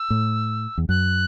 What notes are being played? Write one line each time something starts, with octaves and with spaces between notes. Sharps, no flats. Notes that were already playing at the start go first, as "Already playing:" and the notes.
Already playing: E6
A2
E2
F#2 F#6